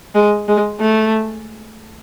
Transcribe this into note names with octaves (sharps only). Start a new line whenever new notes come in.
G#3
G#3
A3